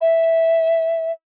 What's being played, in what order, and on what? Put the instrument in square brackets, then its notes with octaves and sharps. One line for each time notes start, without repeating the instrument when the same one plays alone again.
[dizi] E5